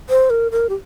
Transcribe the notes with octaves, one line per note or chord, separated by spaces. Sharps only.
C5
A#4
A#4
G4